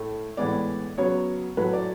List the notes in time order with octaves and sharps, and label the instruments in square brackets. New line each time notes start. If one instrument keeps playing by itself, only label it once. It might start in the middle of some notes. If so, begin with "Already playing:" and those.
Already playing: [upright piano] A2 A3
A2 E3 G#3 B3 D5
C#3 F#3 B3 C#5
A2 F#3 A3 B4
D5